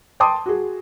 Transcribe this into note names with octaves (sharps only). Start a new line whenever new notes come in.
G5 A5 C6 D6 D#6
F#4 G#4